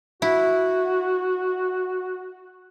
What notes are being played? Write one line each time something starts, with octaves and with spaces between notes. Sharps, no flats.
E4 F#4